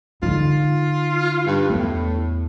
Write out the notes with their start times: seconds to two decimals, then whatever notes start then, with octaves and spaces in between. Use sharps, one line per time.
0.23 D3 D#4 F4
1.47 G2
1.70 E2 A2